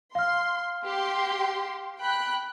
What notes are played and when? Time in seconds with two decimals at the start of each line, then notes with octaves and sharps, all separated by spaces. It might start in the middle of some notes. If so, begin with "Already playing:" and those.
0.15 F5 C6 F6
0.85 G4 C6
1.99 G5 B5 F#6